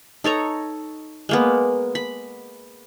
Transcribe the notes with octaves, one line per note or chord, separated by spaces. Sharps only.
D#4 A4 C#5 A#5
G#3 A#3 B3
B5